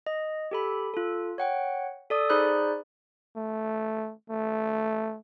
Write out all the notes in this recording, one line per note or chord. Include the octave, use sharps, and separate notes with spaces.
D#5
G4 A4 B5
F4 A4
C#5 F#5 G5
A4 D5 D#6
D#4 G#4 C5 D5 B5 F#6
A3
A3